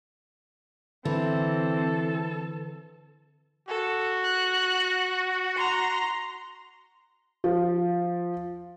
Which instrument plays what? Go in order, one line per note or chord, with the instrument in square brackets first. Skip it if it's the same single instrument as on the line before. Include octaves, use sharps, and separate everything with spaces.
[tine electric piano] D3 [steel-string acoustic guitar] E3 [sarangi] C4 [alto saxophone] A4
[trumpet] F#4 [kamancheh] A4
[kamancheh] F#6
A#5 C6
[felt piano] F3